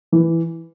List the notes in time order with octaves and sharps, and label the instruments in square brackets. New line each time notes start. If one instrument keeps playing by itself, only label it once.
[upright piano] E3